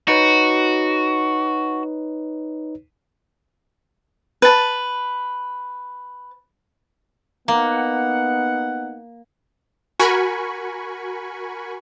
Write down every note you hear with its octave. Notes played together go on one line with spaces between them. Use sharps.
D#4 F#4 B4 C#5
B4 A5
A#3 B3 D#4 F#5
F#4 A#4 G#5 B5 C#6